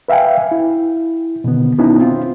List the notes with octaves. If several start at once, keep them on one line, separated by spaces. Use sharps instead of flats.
B4 E5 F5 G5 G#5
E4
B2 D3 D#3 B3
D#3 B3 C#4 D#4 E4
C4 F4